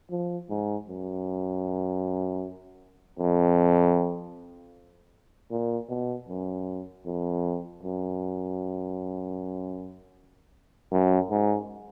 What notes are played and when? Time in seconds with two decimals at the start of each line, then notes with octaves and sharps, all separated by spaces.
0.11 F3
0.50 G#2
0.88 F#2
3.19 F2
5.51 A#2
5.89 B2
6.29 F#2
7.06 F2
7.83 F#2
10.92 F#2
11.31 G#2